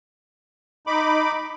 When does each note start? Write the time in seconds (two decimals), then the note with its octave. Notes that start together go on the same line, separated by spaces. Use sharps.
0.87 D#4 B5 D6